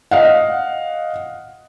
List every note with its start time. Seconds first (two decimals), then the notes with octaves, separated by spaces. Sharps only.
0.11 D#5 F5 F#5